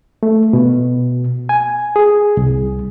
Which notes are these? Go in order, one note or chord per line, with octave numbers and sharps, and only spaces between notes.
A3
B2
G#5
G#4
C2